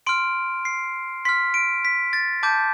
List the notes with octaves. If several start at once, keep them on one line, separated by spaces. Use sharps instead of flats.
C6 F6 D7
C7
C6 F6 B6
D7
B6
A6
A5 D6 G6